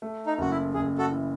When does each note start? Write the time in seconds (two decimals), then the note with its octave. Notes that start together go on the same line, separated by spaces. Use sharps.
0.02 A3
0.27 D#4
0.38 F#1 F#4
0.50 E4
0.74 F#1 G#4
0.98 F#4 A4
1.11 E3